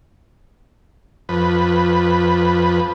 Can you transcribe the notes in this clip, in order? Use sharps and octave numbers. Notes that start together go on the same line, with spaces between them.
F2 B4